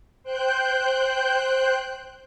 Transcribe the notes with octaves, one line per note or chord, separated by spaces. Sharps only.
C5 G5 F#6 G6